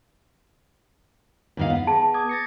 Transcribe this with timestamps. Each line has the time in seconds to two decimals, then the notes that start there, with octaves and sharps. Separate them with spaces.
1.57 D#2 D#3 F5
1.70 B3
1.87 G#4 A5
2.14 D6 D#6 G#6
2.29 A6 A#6 C#7